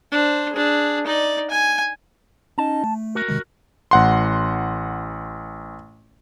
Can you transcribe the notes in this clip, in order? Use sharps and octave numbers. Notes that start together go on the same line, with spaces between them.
D4 C5
D4 G#4
D#4 D5
G#5
C#4 D#4 D#5 A5
A3
F#4 A#4
C3 D#3 G#3
A1 F#5 C6